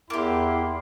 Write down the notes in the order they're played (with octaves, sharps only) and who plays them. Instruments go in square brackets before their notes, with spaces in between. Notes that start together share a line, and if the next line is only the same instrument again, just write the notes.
[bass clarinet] E2 [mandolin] A#3 G4 [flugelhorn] E4 [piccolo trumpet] C6